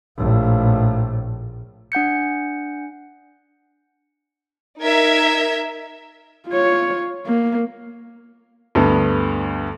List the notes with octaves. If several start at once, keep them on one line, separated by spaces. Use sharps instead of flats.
A#1 A2
D4 F#5 G6 C#7
D#4 A#4 E5 G#6
F4 C#5
A#3
D2 G2 B3